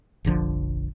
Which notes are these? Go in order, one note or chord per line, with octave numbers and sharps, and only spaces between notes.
F1 A#1 D3 F3